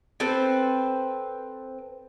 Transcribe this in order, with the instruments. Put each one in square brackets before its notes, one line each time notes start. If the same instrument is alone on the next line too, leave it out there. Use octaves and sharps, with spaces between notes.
[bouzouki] C4 A4 B4 C5